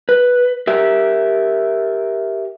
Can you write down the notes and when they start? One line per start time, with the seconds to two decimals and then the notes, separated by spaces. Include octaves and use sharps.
0.09 B4
0.67 G4 A#4 E5